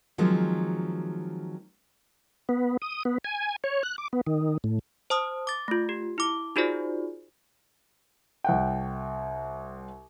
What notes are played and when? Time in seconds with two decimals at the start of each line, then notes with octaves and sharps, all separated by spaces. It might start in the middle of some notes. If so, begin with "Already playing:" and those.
0.18 D#3 F3 F#3 G#3 C4
2.49 B3
2.82 D#6
3.05 B3
3.24 G#5
3.64 C#5
3.83 F#6
3.98 D6
4.13 B3
4.26 D#3
4.64 A2
5.10 C5 A5 D#6 F6
5.47 D6 A6
5.68 A3 F4
5.89 G4
6.18 E4 D6
6.56 D#4 F4 F#4 G#4 C5 D5
8.44 C2 F#5 G5